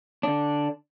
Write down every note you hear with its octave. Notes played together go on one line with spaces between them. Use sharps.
D3 D4